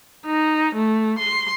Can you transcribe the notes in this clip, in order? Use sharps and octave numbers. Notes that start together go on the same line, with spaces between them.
D#4
A3
C6